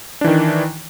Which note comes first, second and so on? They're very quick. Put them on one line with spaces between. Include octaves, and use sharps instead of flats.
D4 E3 D#3